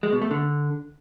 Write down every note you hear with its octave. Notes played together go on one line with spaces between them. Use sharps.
G#3
B2
A3
D3